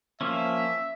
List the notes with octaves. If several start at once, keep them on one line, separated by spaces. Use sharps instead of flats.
F3 A#3 C#4 E5